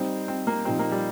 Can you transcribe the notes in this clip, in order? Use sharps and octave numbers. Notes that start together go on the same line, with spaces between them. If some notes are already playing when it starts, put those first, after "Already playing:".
Already playing: G3 C4 D#4 C5 D#5
C4
A#3
A#2 F3 C4 D#4 G4
A#3
G3